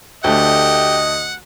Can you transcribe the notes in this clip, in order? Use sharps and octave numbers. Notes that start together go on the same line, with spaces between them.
D2 A3 G4 D#5 F#5